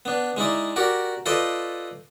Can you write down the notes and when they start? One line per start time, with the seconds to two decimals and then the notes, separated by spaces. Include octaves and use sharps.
0.05 B3 D4
0.37 G#3 D#4 E4 D5
0.76 F#4 G4 A#4 D5
1.26 F4 A4 B4 D5 D#5 G5